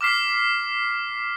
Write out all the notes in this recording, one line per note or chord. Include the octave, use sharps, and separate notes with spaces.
D6 F6 B6 C7